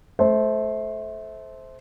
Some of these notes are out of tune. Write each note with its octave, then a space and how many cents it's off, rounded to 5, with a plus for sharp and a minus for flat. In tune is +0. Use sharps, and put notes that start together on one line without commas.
A3 -25 C5 +0